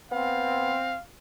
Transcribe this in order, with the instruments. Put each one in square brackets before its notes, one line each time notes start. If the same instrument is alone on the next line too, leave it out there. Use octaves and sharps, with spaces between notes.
[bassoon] B3 [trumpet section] C4 [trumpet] F5